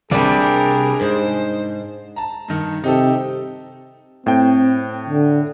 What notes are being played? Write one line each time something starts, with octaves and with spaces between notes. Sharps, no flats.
C2 C3 G3 D4 G#4 A#4 D5
G#2 C5
A5 A#5
G2 D#3
C3 D#4 G4 A4
A2 C4 G5
D3